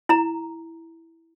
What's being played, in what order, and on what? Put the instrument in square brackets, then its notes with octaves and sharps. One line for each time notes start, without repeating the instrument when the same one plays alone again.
[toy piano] E4 A#5